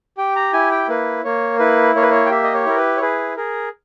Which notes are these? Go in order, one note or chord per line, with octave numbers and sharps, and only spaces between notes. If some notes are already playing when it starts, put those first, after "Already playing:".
G4 G5
A#5
E4 G#5
G5
A#3 B4
A#3 C#5
E4 B4
A#3 C#5
B4
C#5
G5
G4 E5
D#5
C#5
E4 A#4
B4
C#5
G#4 B4
G#4 A#4